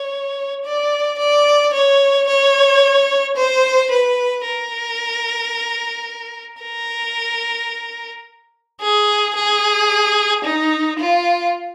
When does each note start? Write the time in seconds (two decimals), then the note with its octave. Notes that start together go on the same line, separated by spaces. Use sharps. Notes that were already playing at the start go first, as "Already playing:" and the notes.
Already playing: C#5
0.64 D5
1.18 D5
1.73 C#5
2.28 C#5
3.36 C5
3.91 B4
4.45 A#4
6.62 A#4
8.81 G#4
9.35 G#4
10.44 D#4
10.98 F4